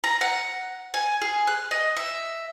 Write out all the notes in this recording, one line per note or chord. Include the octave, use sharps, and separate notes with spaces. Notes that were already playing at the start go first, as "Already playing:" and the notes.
A#5
F#5
G#5
G#4
F#6
D#5
E5